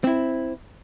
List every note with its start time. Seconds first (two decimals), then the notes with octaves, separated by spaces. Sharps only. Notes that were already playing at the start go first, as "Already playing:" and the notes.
0.04 C4 E4